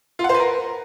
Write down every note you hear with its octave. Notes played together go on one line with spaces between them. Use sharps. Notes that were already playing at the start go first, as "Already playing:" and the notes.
F4
F#5
C5
B4
A#4